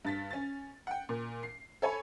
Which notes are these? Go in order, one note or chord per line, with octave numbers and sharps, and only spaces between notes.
G2 A6 B6
C#4 A6
F#5 G5
A#2
C7
A4 C#5 G#5 B5